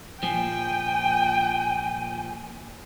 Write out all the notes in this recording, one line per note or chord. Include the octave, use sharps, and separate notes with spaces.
A#2 F3 G5 G#5